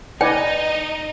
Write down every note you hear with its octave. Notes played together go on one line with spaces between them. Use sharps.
D#4 B4 D5 D#5 G5 G#5